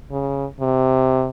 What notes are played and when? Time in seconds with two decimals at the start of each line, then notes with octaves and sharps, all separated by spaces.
0.11 C#3
0.60 C3